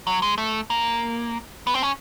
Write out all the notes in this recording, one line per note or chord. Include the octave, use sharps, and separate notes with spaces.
F#3
G#3
A3
A#3
B3
C4
C#4